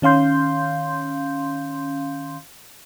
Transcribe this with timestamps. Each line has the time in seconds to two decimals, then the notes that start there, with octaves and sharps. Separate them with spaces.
0.02 D#3 C#4 F5 C6 G6